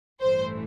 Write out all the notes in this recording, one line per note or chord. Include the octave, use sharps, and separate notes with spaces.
A1 G2 E3 A3 C5